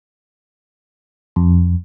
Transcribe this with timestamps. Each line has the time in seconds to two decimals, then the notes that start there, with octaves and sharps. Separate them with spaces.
1.36 F2